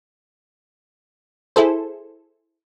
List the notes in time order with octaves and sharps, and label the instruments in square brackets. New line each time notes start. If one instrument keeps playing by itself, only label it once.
[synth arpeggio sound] E4 G#4 A4 C5